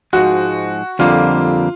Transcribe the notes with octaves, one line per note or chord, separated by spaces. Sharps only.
G#2 F3 G#3 F#4
F2 D3 G3 A#3 F4